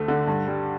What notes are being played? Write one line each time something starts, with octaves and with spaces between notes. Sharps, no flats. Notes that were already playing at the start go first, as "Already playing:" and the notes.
Already playing: D2 A3
D3
G2
G3